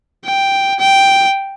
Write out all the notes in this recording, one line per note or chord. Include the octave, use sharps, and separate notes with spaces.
G5
G5